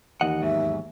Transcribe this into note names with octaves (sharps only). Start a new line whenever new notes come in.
D#2 E3 D#5 F#5
E2 G#2 F#3 E5